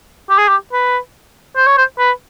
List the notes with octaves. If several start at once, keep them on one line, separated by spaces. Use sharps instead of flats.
G4
G#4
G4
B4
C5
C#5
C5
B4